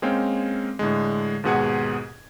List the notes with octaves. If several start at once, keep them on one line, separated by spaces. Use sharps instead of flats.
G#3 A#3 C4 C#4 F5 G5
A2 D3 G#3
D#2 G#2 B2 G#4 F#5 G#6